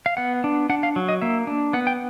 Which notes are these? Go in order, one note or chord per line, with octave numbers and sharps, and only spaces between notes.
F5
B3 F#5
D4
D4 F#5
F5
F#3
D#5
A#3 E5
D4
B3 F#5
G5